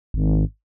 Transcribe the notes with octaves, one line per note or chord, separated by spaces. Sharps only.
G#1